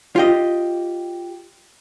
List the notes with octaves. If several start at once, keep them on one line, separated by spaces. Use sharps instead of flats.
F4 G4 D#5